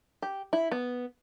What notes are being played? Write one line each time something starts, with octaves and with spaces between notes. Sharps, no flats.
G4
E4
B3